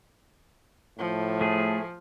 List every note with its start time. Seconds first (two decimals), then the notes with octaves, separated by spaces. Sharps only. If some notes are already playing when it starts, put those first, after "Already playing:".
0.99 A2 F3
1.41 A3 G#4